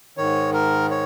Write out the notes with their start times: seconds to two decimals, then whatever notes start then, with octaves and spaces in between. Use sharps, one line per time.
0.17 G#2 D#3 C#5
0.53 A#4
0.91 C#5